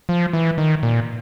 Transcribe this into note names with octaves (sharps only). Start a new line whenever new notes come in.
F3
E3
D#3
A#2